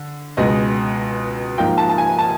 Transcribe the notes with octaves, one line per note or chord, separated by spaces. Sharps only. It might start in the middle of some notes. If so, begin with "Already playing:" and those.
Already playing: D3
C#2 B2 G#3 D#5
G#2 F3 A#3 G5
A5
A5
G#5
A5